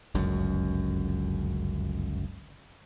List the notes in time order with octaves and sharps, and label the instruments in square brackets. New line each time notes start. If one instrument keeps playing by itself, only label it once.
[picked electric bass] G1 C#2 F#2